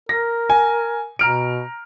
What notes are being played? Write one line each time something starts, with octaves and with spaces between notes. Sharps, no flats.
A#4 A#6
G#5
B2 A#5 F6 D7